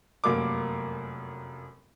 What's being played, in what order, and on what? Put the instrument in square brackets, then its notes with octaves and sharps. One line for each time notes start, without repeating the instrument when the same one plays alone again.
[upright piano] F1 F#2 A#3 D6